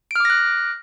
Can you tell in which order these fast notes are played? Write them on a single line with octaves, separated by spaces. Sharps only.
D7 F6 D6 A#6 F#6